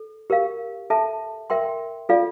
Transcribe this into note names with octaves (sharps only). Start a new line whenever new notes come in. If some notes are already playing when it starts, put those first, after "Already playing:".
Already playing: A4
G4 A#4 F5
A4 E5 A5
A#4 E5 G5 C6
F4 A4 D5 F5